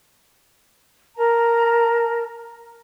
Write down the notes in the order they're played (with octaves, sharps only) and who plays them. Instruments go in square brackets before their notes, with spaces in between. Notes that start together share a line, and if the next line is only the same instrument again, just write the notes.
[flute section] A#4 A5 A#5